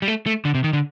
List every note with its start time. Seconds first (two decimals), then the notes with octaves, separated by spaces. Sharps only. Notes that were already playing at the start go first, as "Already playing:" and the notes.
0.02 G3
0.08 A3
0.26 A3
0.45 D3
0.55 C3
0.64 D#3
0.73 D3